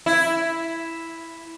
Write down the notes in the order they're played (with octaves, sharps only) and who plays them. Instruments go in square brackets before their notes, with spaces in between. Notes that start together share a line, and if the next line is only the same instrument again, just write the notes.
[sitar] E4